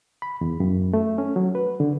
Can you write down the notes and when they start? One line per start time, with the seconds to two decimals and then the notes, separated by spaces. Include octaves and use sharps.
0.22 B5
0.41 E2
0.60 F#2
0.93 A3
1.18 C#4
1.36 F#3
1.55 B4
1.80 D3